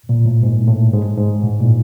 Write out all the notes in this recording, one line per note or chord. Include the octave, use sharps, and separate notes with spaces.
A#2
A2
G#2
A2
G#2
G#2
A2
A#2